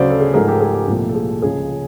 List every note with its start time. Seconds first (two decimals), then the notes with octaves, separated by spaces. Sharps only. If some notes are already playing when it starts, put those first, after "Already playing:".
Already playing: D2 C#3 F#3 C5 D5
0.10 A4
0.20 G#4
0.34 G#2 F3 A3 G#4 A#4
0.48 G4 A4
0.61 G#4
0.74 G4
0.88 C2 A#2 F3 A3
1.09 A4
1.15 G#4
1.42 C#2 C#3 F3 G#4